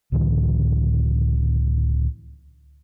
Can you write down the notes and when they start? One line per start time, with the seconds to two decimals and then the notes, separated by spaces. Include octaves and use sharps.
0.12 C#2 A2 D3 E3